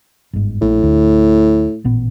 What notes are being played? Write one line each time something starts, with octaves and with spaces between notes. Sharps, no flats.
G1 G#2
A#1 A2
D2
A1 A#2 B3